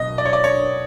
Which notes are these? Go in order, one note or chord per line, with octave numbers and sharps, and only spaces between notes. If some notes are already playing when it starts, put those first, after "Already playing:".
Already playing: B2 F#3 D#5
D5
C#5
D5
C#5